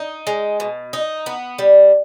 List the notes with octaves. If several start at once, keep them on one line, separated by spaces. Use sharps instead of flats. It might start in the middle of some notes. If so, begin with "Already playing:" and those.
Already playing: D#4
G#3
B2
D#4
B3
G3